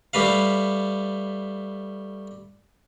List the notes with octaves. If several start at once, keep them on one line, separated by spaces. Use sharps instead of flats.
G3 A3 B4 F5